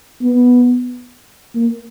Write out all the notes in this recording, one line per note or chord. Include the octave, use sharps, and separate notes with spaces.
B3
A#3